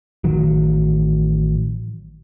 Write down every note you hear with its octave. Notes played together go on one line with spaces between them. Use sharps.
A1 D#3 F#3